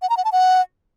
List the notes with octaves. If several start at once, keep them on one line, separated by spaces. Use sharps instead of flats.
F#5
A#5
F#5
A5
F#5